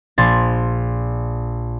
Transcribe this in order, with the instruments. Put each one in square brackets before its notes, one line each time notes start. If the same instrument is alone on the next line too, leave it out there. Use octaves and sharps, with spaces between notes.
[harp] A#1 C6 G#6 A6